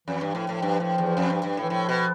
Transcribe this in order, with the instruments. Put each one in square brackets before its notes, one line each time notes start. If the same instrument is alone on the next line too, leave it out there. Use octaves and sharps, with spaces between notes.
[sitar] F2 [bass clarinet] E3
[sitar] G2
[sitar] A2 [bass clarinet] F3
[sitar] A2
G2
A2
E2
F2
G2
G2
A2
[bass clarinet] E3
[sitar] A2 [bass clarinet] F3
[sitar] B2